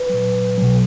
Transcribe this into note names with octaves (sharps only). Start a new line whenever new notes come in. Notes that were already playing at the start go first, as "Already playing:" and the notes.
Already playing: B4
A#2 F#3
B2 F#3